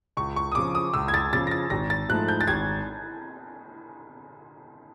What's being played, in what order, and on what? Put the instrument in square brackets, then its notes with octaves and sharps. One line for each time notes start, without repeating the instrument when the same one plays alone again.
[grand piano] C#2 [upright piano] C#6
[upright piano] C#6
D#6
[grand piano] C#3 F3 [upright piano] D6
[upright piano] D#6
[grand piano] C#2 [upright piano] E6
[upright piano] G#6
A6
[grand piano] C#3 F3 [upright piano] A6
[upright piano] A#6
A6
[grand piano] G#1 [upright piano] A#6
[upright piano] A6
[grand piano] G#2 F3 A3 [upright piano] F#6
[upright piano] G6
A6
[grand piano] G#1 [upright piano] G#6